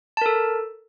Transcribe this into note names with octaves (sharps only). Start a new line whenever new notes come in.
A4 A#4 A5